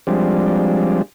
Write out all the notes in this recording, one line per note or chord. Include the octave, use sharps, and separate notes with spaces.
F3 G3 G#3 C4 D4